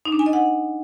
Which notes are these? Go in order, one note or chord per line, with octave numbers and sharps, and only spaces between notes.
D#4
D4
G#5
D#5
F#5